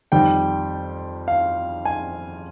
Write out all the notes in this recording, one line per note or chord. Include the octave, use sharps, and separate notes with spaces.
F2 D#3 G3 G5
F5
G#5